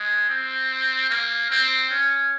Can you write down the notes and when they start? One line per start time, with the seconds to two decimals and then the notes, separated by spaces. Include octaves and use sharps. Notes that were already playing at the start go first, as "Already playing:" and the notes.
Already playing: G#3
0.29 C4
1.10 A#3
1.50 C4
1.90 C#4